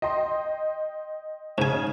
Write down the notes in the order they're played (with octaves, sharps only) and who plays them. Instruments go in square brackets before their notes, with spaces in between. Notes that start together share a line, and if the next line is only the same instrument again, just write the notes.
[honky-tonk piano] D#5 G5 C6
[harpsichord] G#2 G#5 [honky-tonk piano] C#3